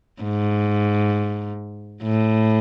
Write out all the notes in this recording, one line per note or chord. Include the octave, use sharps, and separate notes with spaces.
G#2
A2